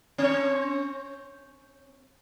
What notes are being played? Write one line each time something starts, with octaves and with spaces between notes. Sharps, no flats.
C4 C#5